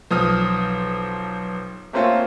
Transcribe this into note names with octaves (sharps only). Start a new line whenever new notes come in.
B1 F3 D#6 F6
A3 A#3 C4 C#4 F4